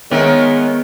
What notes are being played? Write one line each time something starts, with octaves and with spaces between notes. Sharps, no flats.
D#3 G#3 B3 A#4 C#5 E5